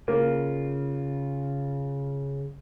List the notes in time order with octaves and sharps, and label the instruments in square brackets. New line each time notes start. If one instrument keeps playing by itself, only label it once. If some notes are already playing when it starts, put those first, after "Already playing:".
[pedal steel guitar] C#3 F4 [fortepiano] A#3